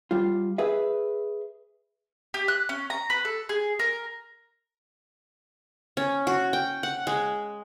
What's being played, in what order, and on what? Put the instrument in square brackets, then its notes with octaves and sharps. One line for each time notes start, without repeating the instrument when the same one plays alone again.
[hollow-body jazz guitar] G3 F4
G#4 B4 E5
[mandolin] G4
F#6
C#4
A#5
B4
A4
G#4
A#4
[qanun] C#4
F#4
G5
F#5
G#3